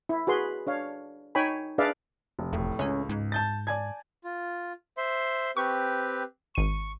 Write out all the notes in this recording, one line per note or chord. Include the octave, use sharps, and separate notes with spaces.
E4
F#4 G#4 B4 C6
D4 C#5 F5
D#4 C#5 G5 G#5 B5
D4 G#4 B4 D5 E5 F5
F1
E1 A2
C#2 C#4
G#2
A5 G6 A6
D5 G#5 A5 G#6
F4
C5 E5 C6
C4 G4 B4 C#6
G#1 C#6 D#7